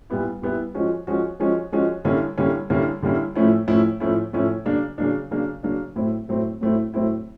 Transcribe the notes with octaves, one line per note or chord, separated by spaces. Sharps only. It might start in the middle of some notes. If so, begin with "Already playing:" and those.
A#2 G3 B3 E4
A#2 G3 B3 E4
F3 G#3 C#4 F#4
F3 G#3 C#4 F#4
F3 G#3 C#4 F#4
F3 G#3 C#4 F#4
D3 G3 A#3 C#4 E4
D3 G3 A#3 C#4 E4
D3 G3 A#3 C#4 E4
D3 G3 A#3 C#4 E4
A2 F3 A3 C#4 E4
A2 F3 A3 C#4 E4
A2 F3 A3 C#4 E4
A2 F3 A3 C#4 E4
C#3 F#3 A#3 D4
C#3 F#3 A#3 D4
C#3 F#3 A#3 D4
C#3 F#3 A#3 D4
A2 F#3 A3 C4 E4
A2 F#3 A3 C4 E4
A2 F#3 A3 C4 E4
A2 F#3 A3 C4 E4